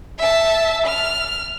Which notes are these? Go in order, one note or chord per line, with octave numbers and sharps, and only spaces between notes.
E5 A5
F6